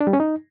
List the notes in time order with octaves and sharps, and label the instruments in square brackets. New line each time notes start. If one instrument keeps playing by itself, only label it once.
[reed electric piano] D4
G3
C#4
D#4